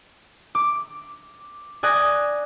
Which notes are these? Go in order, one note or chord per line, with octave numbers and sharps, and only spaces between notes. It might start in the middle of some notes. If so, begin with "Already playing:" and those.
D6
D5 G#5 D#6 F#6 A#6